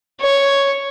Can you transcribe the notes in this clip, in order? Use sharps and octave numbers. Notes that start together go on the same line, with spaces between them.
C#5